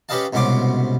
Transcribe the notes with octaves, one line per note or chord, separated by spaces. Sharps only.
C#4 G4 B4 D#5 F5 A5
C2 G#2 B2 C#4 C6 D6